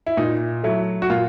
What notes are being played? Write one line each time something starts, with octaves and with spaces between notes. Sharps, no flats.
E4
A#2 D#4
F#3 A3 E4
F#4
A#2 F4